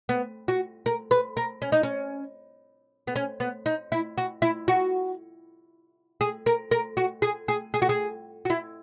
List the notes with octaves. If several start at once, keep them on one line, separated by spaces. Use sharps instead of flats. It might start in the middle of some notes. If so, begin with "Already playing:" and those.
B3
F#4
A#4
B4
A#4
C#4
D#4
C#4
B3
C#4
B3
D#4
E4
F#4
E4
F#4
G#4
A#4
A#4
F#4
G#4
G#4
G#4
F#4
G#4
F#4
E4